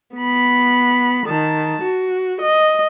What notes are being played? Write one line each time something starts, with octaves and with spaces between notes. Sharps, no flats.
B3 B5
D#3 A5
F#4
D#5